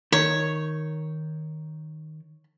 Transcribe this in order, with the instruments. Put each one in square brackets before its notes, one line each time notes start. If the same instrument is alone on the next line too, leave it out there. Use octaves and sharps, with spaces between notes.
[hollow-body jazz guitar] D#3 [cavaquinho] C#5